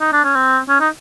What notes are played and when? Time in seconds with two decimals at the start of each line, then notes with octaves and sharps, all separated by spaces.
0.01 D#4
0.13 D4
0.24 C#4
0.35 C4
0.69 C#4
0.81 D#4